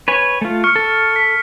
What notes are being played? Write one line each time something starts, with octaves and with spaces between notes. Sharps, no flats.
B4 C#5 G#5
A3 F4
C#6 F6 C#7
A4
B6